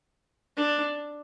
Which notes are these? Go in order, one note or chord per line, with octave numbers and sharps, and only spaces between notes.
D4